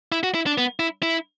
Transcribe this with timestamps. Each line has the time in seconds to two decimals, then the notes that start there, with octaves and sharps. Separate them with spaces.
0.12 E4
0.23 F#4
0.34 E4
0.46 D4
0.58 B3
0.79 E4
1.03 E4